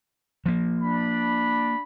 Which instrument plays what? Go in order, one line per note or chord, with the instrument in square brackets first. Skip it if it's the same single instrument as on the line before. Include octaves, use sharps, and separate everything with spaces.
[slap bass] F3 A#3
[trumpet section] D4 B5